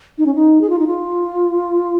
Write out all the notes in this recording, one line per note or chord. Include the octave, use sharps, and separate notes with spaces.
D#4
C#4
D#4
G#4
F4
D#4
F4